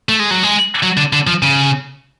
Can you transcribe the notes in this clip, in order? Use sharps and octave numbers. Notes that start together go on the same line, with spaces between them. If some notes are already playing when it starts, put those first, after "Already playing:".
A3
G#3
F#3
G#3
F#3
D3
D3
F3
C#3